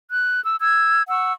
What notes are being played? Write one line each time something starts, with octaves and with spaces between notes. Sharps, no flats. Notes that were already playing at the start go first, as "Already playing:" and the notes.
F#6
E6
E6 G#6
F#5 C#6 E6